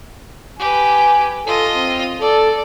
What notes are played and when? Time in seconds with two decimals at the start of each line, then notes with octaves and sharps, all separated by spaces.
0.59 G4 B4 G#5
1.46 F4 A4 D#5
1.75 C4
2.21 A4 D5